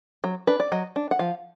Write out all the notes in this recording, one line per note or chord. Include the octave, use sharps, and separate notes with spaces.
F#3
D4 B4
D5
F#3 D#5
D4
F#5
F3 F5